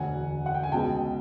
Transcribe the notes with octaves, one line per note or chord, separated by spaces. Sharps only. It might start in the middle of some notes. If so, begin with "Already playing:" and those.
Already playing: E1 D2 D3 F#5 G#5
F#5
G5
G#5
C#2 B2 G#3 G5 A5